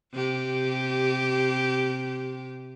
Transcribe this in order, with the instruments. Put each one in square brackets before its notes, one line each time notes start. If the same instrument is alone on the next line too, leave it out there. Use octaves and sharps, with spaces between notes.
[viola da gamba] C3 G4